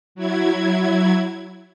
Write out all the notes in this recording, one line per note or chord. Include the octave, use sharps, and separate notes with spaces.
F#3 E4 G#6